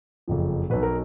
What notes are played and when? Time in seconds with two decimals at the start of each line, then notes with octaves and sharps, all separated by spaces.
0.28 F#1 F2 F3
0.70 B1 B2 B4
0.83 A#4